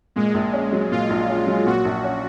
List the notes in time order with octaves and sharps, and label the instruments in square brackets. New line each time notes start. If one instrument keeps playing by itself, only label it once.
[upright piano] A#2 [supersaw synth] G#3
[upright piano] A#1
C#4
F#3
[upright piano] A#2 [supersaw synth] F4
[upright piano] A#1
C#4
F#3
[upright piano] A#2 [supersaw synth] F#4
[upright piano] A#1
C#4